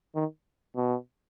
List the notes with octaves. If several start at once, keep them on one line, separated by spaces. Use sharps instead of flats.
D#3
B2